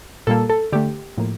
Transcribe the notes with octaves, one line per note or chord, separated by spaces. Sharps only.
A#2 G3 A#3 A4
A4
D3 A3 G4
A2 F3 A#3